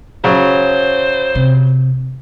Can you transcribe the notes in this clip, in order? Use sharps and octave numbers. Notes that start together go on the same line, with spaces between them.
C#3 F#3 C5
C3